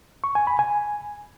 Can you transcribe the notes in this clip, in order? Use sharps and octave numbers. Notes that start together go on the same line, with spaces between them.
C#6
G#5
B5
G#5